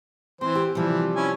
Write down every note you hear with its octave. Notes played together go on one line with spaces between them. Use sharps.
E3 C4 C5
G4
C3 E3 F3 G3
C#4 E4 G#5